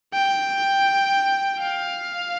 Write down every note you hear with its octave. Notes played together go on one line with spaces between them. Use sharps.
G5
F5